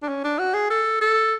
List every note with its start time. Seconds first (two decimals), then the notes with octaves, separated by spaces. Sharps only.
0.03 D4
0.08 C#4
0.24 D4
0.39 F#4
0.54 G#4
0.70 A4
1.01 A4